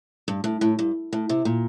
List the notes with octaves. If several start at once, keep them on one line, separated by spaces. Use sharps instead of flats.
G2
A2
A2
G2
A2
C3
A#2